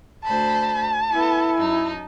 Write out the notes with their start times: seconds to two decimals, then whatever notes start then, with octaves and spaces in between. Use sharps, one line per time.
0.24 D2 C5 A5 B5
1.11 B3 E4 A4
1.57 F#2 D#4